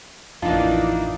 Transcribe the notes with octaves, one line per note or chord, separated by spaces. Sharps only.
A1 F2 E3 A#3 D4 D#4 F4 D5